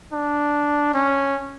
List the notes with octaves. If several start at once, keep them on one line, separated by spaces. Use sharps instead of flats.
D4
C#4